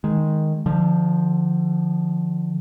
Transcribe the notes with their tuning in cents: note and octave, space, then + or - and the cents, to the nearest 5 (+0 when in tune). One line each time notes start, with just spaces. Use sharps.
D#3 +0 G#3 +0
D3 +35 F3 +0